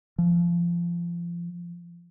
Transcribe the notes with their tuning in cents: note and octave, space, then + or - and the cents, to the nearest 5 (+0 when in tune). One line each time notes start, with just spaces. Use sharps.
F3 -25